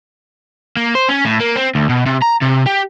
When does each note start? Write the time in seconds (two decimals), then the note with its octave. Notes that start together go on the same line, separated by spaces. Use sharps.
0.77 A#3
0.95 C5
1.09 C#4
1.25 A2
1.40 A#3
1.56 C4
1.75 D2
1.89 B2
2.06 C3
2.22 A#5
2.41 C3
2.66 G4